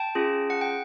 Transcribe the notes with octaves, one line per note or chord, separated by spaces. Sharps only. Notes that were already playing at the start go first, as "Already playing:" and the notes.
Already playing: G5 A5
C#4 F4 G#4
F#5
G5